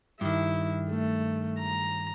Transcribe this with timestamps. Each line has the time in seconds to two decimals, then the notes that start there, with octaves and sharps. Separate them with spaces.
0.21 G2 D#3 E4
0.90 A3
1.59 A#5